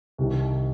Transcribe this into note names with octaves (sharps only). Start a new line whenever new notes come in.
C2 C3 D#3